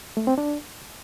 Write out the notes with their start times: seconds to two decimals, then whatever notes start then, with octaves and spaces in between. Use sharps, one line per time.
0.17 A3
0.27 C4
0.38 D4